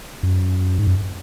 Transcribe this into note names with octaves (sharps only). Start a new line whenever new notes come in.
F#2
G#2
F#2